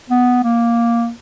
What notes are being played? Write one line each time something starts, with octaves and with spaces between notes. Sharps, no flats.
B3
A#3